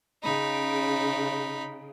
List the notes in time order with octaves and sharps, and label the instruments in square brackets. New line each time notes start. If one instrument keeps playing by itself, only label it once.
[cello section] C#3 [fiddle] D#4 B5